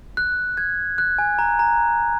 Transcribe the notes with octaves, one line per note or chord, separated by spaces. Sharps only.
F#6
G#6
F#6
G#5
A#5
A#5